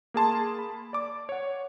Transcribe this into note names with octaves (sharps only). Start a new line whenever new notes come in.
A#3 G#4 A5 C6
B5
D5 D6
C#5 F#5